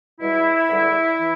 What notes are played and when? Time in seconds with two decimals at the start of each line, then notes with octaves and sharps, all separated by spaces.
0.20 E2 B2 G3 E4
0.69 E2 D3 G3
1.19 E3